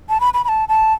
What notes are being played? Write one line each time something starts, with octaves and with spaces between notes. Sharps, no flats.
A5
B5
B5
B5
A5
A5